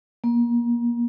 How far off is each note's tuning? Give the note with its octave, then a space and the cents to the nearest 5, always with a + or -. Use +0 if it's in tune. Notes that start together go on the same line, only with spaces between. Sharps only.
A#3 +30